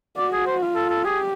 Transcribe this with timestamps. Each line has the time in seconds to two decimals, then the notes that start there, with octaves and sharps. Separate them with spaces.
0.17 F#4 D5
0.33 G#4
0.46 C5
0.62 F4
0.75 A4
0.90 A4
1.05 G4 G#4